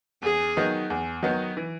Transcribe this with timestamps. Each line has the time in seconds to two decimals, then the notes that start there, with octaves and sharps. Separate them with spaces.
0.23 E2 G#4
0.57 D#3 F#3 B3 D#4
0.90 E2
1.23 D#3 F#3 B3 D#4
1.57 E3